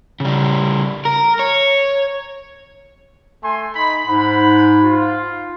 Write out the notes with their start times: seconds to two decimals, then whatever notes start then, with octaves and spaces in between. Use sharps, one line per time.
0.20 C#3 G3
1.05 A#4
1.39 C#5
3.42 A3 G#5 C6
3.74 D#4 B5
4.07 G#2 F#5 B5
4.82 F4